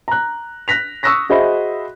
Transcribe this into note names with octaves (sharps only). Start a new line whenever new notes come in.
A#5 F#6
F#6 A#6 B6 F7
C#6 D#6 E6 F#6 A#6 B6
F#4 G#4 C5 D#5 E5 B5